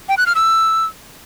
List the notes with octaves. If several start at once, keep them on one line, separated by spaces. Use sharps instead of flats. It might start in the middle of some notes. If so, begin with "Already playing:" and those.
G5
F#6
F6
E6